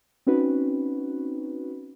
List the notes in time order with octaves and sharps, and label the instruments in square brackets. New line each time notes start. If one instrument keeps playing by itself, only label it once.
[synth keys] C4 C#4 D#4 F#4 B4